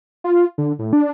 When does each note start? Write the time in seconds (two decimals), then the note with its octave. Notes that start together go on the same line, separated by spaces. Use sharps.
0.24 F4
0.58 D3
0.79 A2
0.93 D4